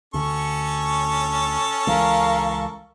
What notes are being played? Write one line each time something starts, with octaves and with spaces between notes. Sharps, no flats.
D2 D3 C#4 A4 C#6
C#2 E3 G#3 A#4 F5